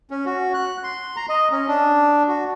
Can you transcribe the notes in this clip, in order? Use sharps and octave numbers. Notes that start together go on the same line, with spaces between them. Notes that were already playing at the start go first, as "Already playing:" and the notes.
C#4
F#4
F#6
C6
A#5
D#5
C#4
D4
F#4